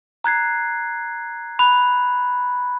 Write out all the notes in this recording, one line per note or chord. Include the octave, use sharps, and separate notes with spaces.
A#5 F#6 G#6 C7
B5 F#6